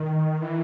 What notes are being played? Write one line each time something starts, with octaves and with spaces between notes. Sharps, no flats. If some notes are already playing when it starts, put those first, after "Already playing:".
Already playing: D#3
E3